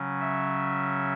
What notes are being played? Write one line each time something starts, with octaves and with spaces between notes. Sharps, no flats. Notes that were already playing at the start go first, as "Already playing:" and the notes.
Already playing: C#3 F#3 C#4
E5